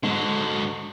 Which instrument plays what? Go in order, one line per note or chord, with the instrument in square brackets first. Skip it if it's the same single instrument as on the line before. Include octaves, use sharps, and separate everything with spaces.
[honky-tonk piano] G#2 [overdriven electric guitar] D3 F#3